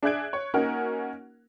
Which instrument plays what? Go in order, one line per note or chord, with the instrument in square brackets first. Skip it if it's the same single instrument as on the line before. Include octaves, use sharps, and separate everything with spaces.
[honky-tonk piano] D4 G#4 E5 F#6 G#6 D7
C#5
A#3 C#4 D#4 F#4 A#4 F#5